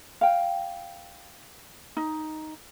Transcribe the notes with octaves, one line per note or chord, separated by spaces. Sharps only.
F5 G5
D#4